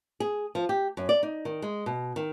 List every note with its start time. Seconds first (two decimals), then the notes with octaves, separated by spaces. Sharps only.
0.20 G#4
0.55 F3
0.69 G4
0.97 F#2
1.09 D5
1.23 D#4
1.45 D#3
1.62 G#3
1.86 B2
2.16 D#3